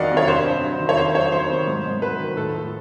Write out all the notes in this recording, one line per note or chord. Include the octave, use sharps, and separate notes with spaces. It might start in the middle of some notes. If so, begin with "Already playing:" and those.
Already playing: F2 D#3 E3 F#3 D5 D#5 F5 F#5
C3
C#5
G2 C5
G2
F#3
D#3
C#5
F2 C5
F#3 C#5
D#3 C5
C3
G#2
G#2
F#3 B4
D#3
A2 A4
F3